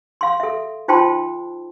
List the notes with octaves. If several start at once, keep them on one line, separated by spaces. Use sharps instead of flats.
F5 C6
A4 E5
D#4 F4 C5 G5 A5 C6